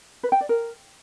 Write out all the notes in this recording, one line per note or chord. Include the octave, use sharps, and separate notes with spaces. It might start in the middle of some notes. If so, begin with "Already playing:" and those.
B4
G5
D5
A#4